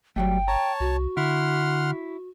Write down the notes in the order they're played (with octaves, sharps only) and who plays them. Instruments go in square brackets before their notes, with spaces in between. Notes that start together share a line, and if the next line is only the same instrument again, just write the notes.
[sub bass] G1 [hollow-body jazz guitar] F#3 G3 A3 [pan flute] G5
[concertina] C#5 A5 [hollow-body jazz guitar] A#5
[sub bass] C2 [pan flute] F#4
[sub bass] D3 [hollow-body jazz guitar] E4 [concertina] F#5 C6 F6